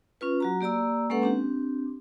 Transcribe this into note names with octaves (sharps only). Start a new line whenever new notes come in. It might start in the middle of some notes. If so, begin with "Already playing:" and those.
C#4 F4 B4
F#3 F#4 A#5
A#3 G4 D5 A#5 E6
G#3 A#3 C#4 A4 B4 F#5
C4 D4 G4